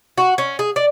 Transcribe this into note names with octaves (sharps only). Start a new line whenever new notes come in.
F#4
C#4
G#4
D5